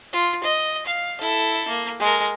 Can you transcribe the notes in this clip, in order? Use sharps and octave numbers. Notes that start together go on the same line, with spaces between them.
F4
D#5
F5
E4 A4
A#3
G#3 A#4